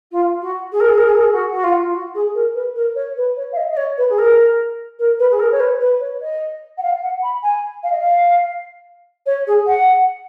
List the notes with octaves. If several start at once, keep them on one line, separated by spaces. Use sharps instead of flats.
F4
F#4
G#4
A#4
G#4
A#4
G#4
A#4
G#4
F#4
F#4
F4
F4
F#4
G#4
A#4
B4
A#4
C#5
B4
C#5
F5
D#5
D#5
C#5
B4
G#4
A#4
A#4
B4
G#4
A#4
C#5
B4
B4
C#5
D#5
F#5
F5
F#5
B5
G#5
F5
D#5
F5
C#5
G#4
F#5